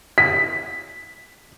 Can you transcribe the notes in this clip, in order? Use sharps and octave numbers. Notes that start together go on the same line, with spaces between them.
B6